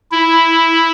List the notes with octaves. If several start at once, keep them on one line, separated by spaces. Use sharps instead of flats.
E4